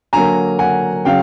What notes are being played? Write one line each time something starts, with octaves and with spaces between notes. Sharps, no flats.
D3 F#3 A#3 G#5 A#5
F#5 G#5
C#3 F#3 F5 G5